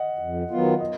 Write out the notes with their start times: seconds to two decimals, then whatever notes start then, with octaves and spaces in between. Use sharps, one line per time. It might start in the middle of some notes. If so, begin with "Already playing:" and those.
Already playing: D#5 F#5
0.19 F2
0.50 D#3 F#3 B3 F4
0.80 D#5